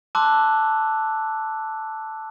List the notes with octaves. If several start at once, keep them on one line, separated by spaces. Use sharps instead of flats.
A5 C6 D6 E6 F#6